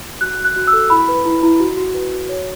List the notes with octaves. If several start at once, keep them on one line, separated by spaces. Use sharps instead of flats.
F#4 F#6
F#4
F#6
F#4
E6
A4
E4 B5
B4
E4
E4
F#4
F#4
B4
F#4
C#5